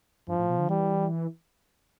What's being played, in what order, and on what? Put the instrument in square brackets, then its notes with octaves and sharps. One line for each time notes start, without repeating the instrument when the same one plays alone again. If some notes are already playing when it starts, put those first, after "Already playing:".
[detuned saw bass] G2 [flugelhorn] F3
[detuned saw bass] A2
B2
D3
[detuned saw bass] E3 [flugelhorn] G3